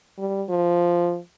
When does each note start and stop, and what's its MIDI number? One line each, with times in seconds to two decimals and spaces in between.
0.18 0.44 55
0.49 1.18 53